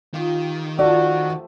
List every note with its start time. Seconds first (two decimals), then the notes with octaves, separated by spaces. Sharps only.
0.14 D#3 F4 G4 F5
0.79 F3 A3 F#4 D5 E5